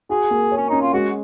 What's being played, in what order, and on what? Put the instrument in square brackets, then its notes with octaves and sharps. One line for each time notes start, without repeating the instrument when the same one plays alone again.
[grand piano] F#4 [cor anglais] G#4
[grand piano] A#3
C#5
[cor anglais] C#4
[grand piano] C#4 [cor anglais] D#4
[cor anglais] F4
[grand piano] G#3 [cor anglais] F#4